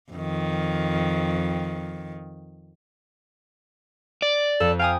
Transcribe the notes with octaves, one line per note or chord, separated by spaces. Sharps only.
F2 D#3
D5
F2 A4
F5 G5 G#5 D#6